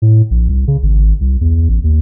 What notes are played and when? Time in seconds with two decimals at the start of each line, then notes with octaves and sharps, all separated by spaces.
0.02 A2
0.31 A#1
0.49 C2
0.68 C#3
0.83 G#1
1.21 C2
1.41 E2
1.69 A1
1.84 D#2